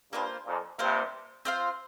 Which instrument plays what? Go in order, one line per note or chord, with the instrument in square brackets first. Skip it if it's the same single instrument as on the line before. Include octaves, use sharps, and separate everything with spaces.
[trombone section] G2 [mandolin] A#3 F4 C5
[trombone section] F2 A#2
[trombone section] G2 C3 [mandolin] A#3 F4 C5
[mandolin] C4 F4 C5 F5